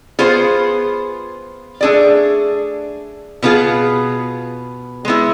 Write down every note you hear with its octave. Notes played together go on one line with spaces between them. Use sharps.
B3 F4 G#4 C5
A3 D4 G#4 D5
B2 B3 F4 G#4
G#3 B3 E4